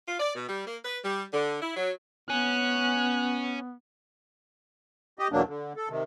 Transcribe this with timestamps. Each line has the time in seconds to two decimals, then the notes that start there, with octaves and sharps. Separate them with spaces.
0.08 F4
0.20 D5
0.35 B2
0.48 G3
0.67 A#3
0.84 B4
1.05 G3
1.33 D3
1.62 E4
1.76 F#3
2.30 B3 C#4 F#6
5.19 G4 D#5
5.32 E2 B2 F#3 A#3 D4
5.48 D3
5.76 A4
5.89 C3 D#3